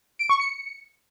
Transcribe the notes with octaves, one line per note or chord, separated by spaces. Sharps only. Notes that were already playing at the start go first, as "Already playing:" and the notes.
D7
C#6
C#7